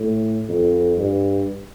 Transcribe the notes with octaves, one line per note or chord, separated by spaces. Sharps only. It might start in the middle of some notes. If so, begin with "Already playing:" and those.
Already playing: A2
F2
G2